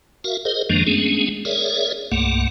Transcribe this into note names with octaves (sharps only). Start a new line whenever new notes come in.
F#4 A#4 E5 F5
G#4 A#4 C5 D#5
F#2 D#3 F3 G#3 A#3 D4
G#3 A3 B3 C#4 D4 G#4
G#4 A#4 C#5 D5 E5
C2 G2 A3 A#3 F#5